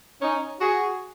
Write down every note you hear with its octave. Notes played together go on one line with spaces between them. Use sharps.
C#4 D#4
F#4 G#4